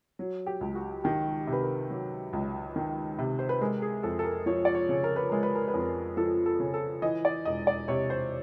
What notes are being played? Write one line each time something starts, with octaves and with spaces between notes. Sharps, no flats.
F#3
G4
C#2
F#4
D#3 G4
C3
B4
A#4
F#3
C#2
D#3
C3
C5
B4
G#3 A#4
G#4
F2 A4
A4
A#4
F3 C#5
D5
C#5
C#3
A#4
B4
G#3 A#4
B4
A#4
B4
F2
A#4
F3 A4
A4
C#3
A4
E3 D#5
D5
E1 D#5
D5
C3 C#5
C5